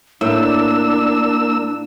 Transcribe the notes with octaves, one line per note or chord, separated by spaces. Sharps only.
A2 A#3 D4 E6